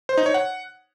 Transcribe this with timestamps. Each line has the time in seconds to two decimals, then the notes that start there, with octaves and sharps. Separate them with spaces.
0.09 C5
0.18 D#4
0.26 C#5
0.34 F#5